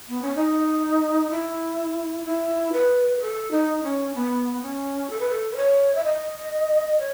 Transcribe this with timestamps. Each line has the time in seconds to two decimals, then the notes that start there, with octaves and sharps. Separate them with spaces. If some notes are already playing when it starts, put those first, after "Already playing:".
0.08 B3
0.21 C#4
0.35 D#4
1.30 E4
2.25 E4
2.72 B4
3.20 A4
3.51 D#4
3.83 C#4
4.14 B3
4.61 C#4
5.09 A4
5.19 B4
5.29 A4
5.51 B4
5.56 C#5
5.95 E5
6.04 D#5
6.98 C#5